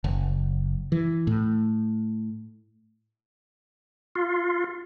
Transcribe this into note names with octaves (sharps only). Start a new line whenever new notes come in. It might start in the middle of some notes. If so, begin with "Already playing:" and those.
F#1
E3
A2
F4